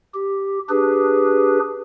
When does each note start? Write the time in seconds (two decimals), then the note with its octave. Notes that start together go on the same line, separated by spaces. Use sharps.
0.14 G4
0.69 D4 G4 G#4 B4